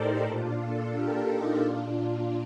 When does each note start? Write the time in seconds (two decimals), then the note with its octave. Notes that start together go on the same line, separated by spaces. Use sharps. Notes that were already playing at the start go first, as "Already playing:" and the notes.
Already playing: A2 D#4 G4 A4 A#4 C5 D5
0.25 A#2 D4 F4
0.58 F4 A4
0.91 G4 A#4
1.26 D#4 G4
1.59 A#2 D4 F4
1.92 D4